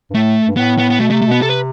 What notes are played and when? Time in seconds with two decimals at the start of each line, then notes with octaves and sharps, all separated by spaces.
0.10 G2
0.14 A2 A3
0.48 G2
0.57 A2 B3
0.78 B3
0.90 B3
0.99 B2 A3
1.10 C3 A3
1.21 A3
1.26 B2
1.31 B3
1.42 C3 A4
1.50 B4